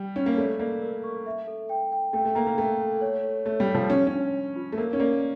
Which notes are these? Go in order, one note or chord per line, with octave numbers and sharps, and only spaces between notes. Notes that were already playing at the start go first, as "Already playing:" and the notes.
Already playing: G3
C#4 C#5
A#3
A3 D5
A#3 D5
A#4
C#6
E5
A4
G5
G5
A3 G5
A3
A#3 A#5
A#3
A3 G5
A4
C#5
C#5
A3 C#5
G3
C#5
F3
C#4 F4
C#4
D4
D4
F4
A3
A#3 A#4
C#4
A#3 D5